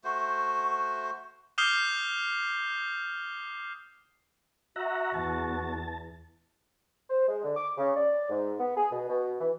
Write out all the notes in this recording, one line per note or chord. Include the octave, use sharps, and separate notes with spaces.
A3 F#4 C5
D6 D#6 F6 G6 C7 G7
F#4 E5 F#5 A#5
E2 A5
C5
G#3
D3
D6
C#3
D5
G#2
B3
G#4
B2
B2
E3